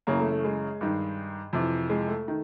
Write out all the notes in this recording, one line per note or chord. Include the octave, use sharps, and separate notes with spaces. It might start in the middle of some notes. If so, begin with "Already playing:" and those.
F#2 C#3 E3 A#3
A3
A3
G#3
G2 D#3
F2 C3 E3
G#3
A3
D#3